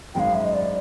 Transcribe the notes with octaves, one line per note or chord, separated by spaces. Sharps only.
G#1 F#2 D#3 G#3 F5 G5
E5
D#5
D5